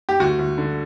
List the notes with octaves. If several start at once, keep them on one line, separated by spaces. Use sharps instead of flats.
G4
D2 F#4
D2
D3